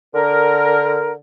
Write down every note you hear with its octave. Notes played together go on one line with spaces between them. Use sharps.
D3 A#4